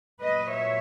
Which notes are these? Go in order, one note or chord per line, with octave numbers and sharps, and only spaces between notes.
A#2 F#3 B4 D#5
C#5 E5